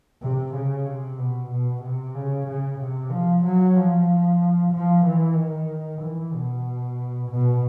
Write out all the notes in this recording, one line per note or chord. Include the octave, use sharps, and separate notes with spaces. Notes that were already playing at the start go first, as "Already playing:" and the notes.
C3
C#3
C3
B2
B2
C3
C#3
C#3
C3
F3
F#3
F3
F3
E3
D#3
E3
B2
B2